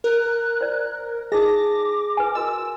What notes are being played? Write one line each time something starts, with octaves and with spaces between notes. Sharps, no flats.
A#4 F#6
C5 D5
D#4 G#4 C5 D#5 D6 A#6
B4 G#5
F#4 A#4 D#5 E6